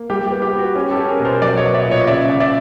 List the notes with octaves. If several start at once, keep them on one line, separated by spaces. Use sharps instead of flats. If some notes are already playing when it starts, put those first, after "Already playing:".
Already playing: A#3
G3 G4
G4
B3
G4
B3
F#4
C#4 G4
G4 A4
C#4
G#4 A#4
B2
A#4 C5
F#3 C5 D5
C#5 D#5
B3
D5 E5
A#2
C#5 D#5
C#3 D5 E5
C#3
D5 E5